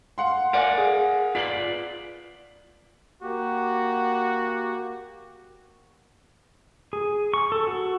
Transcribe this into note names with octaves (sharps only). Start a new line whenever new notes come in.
F5 F#5 C6
A#4 D5 F5 F#5 G#5 D7
G#4
F4 B4 D5 B6 C7 F#7
A#3 F#4 G4
G#4
C#6
A4
F#4